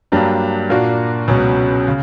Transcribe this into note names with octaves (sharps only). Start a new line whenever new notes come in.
G2 F#3 A#3 D4 G4
A#2 A#3 D4 F#4
C#2 B2 F#3 C#4
C#3